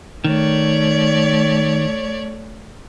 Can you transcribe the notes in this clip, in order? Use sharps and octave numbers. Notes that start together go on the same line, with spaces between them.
D#3 A3 C#5 D5